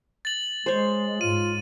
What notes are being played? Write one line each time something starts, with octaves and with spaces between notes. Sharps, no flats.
A6 F#7
G#3 C5 C#5
G#2 F4 D#7